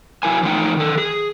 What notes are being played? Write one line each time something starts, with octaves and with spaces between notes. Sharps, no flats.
F#3 E4 A#4 G#5
E3 F3 A3 D#4 G5
D#3 A4
G#4